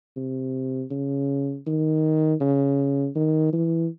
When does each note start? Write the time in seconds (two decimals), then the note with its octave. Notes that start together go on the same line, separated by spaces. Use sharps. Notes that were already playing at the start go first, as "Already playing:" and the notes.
0.17 C3
0.91 C#3
1.67 D#3
2.41 C#3
3.16 D#3
3.53 E3